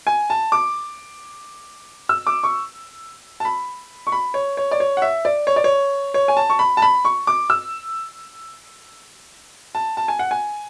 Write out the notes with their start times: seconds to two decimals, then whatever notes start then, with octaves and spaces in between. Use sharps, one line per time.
0.07 G#5
0.30 A5
0.52 D6
2.09 E6
2.27 D6
2.43 C#6
3.40 A5
3.45 B5
4.07 C#6
4.12 B5
4.34 C#5
4.57 C#5
4.71 D5
4.80 C#5
4.97 F#5
5.02 E5
5.25 D5
5.47 C#5
5.56 D5
5.64 C#5
6.14 C#5
6.28 G#5
6.37 A5
6.50 C#6
6.59 B5
6.77 A5
6.82 B5
7.05 C#6
7.27 D6
7.50 E6
9.75 A5
9.97 A5
10.08 G#5
10.19 F#5
10.31 G#5